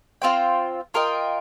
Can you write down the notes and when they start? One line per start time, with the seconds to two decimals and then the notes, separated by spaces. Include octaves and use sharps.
0.22 C4 F4 C5 G5
0.94 F4 A#4 D#5 G5